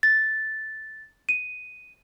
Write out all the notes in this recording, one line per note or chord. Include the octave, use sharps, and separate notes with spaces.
A6
D#7